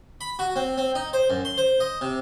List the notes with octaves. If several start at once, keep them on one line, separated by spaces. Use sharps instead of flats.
B5
F#4
C4
C4
D#4
C5
F#2
C6
C5
D#5
C3